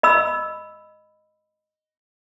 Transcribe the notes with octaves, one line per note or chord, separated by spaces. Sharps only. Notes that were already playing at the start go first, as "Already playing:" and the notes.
D#5 B5 E6